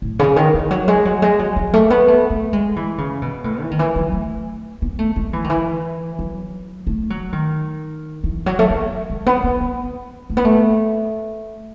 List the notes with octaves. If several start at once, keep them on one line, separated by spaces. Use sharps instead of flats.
A2
C#3
D#3
E3
F#3
G#3
F#3
G#3
F#3
F#3
A3
B3
A3
A3
G#3
E3
C#3
B2
A2
E3
D#3
E3
F#3
A3
B3
A3
G#3
E3
D#3
E3
F#3
A3
F#3
D#3
E3
F#3
A3
G#3
G#3
B3
B3
B3
A3
B3
A3